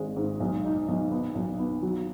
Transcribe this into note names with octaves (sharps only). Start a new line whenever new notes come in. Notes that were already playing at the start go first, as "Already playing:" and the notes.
Already playing: G#1 G#3
G#2
B1
D#4
B1
B3
B1
B3
F#3